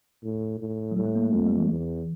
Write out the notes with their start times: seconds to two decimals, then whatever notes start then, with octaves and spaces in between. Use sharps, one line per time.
0.24 A2
0.59 A2
0.91 F#3
0.97 A2 G3
1.05 A3
1.15 A#3
1.24 A3
1.33 F2 G#3
1.46 G3
1.57 E3
1.70 E2